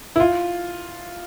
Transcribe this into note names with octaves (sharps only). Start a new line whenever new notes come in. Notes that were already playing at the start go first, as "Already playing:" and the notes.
E4
F4